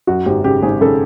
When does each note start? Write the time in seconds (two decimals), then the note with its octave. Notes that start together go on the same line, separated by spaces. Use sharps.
0.07 F#2 F#4
0.26 G#1 G4
0.44 C#3 G4
0.62 G#1 G#4
0.81 C#3 A4